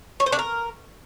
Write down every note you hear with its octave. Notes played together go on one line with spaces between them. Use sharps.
C#5
C5
D4
A#4